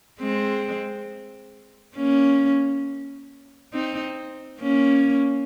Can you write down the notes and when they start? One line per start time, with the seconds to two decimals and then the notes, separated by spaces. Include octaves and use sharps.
0.20 G#3 C4
1.96 A#3 C#4
3.73 C4 D#4
4.61 A#3 C#4